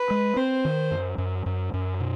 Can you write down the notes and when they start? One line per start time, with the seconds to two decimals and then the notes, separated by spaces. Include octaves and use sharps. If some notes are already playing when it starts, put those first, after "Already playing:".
Already playing: B4
0.10 G#3
0.36 C4 C5
0.65 D#3
0.91 F#2
1.18 F#2
1.46 F#2
1.73 F#2
2.00 B2